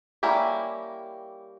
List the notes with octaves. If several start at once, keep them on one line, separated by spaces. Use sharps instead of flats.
G3 A#3 C#4 E4 G4